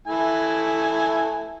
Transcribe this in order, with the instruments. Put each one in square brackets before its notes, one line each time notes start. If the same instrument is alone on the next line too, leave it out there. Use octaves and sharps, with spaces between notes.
[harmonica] A3 E4 G#5